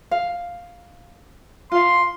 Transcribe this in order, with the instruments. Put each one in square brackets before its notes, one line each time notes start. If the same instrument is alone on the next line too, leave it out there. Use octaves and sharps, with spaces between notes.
[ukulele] F5
[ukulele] F4 F5 [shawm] C6